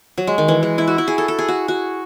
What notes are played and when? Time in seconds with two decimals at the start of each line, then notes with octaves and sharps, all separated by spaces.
0.18 F#3
0.27 G#3
0.38 D#3
0.48 E3
0.63 G#3
0.78 E4
0.88 F#4
0.98 E4
1.08 G#4
1.18 A4
1.28 A4
1.39 G#4
1.48 F#4
1.68 F#4